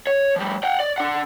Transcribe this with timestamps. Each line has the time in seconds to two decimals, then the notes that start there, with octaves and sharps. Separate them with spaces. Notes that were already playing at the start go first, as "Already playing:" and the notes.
0.07 C#5
0.36 F3 G3
0.64 F#5 G5
0.80 D5
0.98 D4 F#5